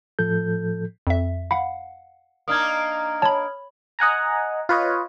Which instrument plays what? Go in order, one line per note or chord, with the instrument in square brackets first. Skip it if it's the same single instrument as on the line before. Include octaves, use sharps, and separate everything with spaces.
[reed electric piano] A2 F3 A4 G6
[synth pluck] F2 E5
[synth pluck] F5 F#5 [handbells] B5
[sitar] A#3 D4 D#4 [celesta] D#6 F6 G#6
[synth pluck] C#5 B5 [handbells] A5
[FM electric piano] D#5 F#5 G#5 A#5
F4 B4 C#5 D#5